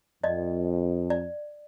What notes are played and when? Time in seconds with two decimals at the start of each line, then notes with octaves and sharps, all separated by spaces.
0.23 F2 D5 D#5
1.10 D5